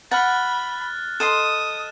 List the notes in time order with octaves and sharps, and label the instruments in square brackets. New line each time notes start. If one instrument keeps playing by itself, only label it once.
[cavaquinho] F#5 [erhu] B5 [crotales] F6 F#6 A6
[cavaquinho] A4 D#5 C6 [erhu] D#6 [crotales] E7